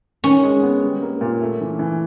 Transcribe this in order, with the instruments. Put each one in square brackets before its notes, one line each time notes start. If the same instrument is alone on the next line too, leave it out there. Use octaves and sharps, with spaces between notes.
[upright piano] D#3 [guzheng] C#4
[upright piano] G#3
B3
G3
A#3
A#2
A3
E3
E3